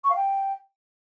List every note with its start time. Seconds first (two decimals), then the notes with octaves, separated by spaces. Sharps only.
0.04 C#6
0.10 F5
0.16 G5